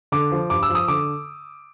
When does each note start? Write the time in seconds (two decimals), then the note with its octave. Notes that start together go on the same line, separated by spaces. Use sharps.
0.12 D3 D6
0.32 F3
0.50 G2 D6
0.63 E6
0.69 F3
0.75 D#6
0.88 D3 D6